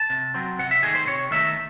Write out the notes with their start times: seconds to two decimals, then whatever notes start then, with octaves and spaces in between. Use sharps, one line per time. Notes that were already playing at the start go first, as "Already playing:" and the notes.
Already playing: A5
0.10 C3
0.34 F#3 C4
0.59 C3 F#5
0.71 E5
0.83 D#3 A3 D#4 G#4
0.95 C5
1.07 C3 C#5
1.31 D#3 A3 D#4 E5